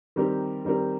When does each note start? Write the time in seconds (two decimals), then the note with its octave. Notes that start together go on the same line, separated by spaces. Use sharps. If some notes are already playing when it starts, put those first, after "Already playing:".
0.16 D#3 G3 C4 G4 A#4
0.65 D#3 G3 C4 G4 A#4